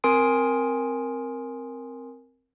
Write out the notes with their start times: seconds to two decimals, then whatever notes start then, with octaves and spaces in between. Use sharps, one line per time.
0.04 C4 A#4 G#5 C6 D#6 D7